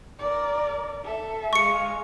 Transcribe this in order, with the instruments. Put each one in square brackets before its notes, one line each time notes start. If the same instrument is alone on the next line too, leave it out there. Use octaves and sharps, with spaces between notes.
[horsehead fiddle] A#4 D5
A4 E5
[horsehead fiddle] G#3 F5 [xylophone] C#6 C#7